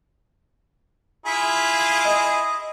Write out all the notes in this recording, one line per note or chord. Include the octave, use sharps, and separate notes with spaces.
E4 F4 G#4 B6
D#5